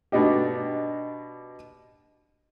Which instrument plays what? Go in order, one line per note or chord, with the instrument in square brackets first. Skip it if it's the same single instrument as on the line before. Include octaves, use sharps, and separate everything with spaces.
[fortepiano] B2 D4 D#4 G4